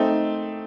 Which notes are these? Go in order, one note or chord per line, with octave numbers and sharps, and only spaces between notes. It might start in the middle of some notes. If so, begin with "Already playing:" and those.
Already playing: A3 C4 D#4